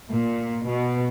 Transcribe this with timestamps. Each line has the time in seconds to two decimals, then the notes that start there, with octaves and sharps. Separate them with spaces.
0.11 A#2
0.66 B2